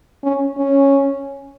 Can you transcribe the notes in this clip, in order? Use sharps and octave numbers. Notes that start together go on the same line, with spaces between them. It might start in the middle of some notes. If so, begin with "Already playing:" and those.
C#4
C#4